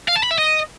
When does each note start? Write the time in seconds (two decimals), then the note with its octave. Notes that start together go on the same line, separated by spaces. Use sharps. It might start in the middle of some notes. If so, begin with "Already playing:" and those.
0.08 F5
0.16 A5
0.23 B5
0.31 E5
0.38 D#5